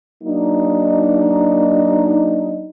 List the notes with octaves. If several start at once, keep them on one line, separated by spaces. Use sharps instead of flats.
F#3 A#3 D4 D#4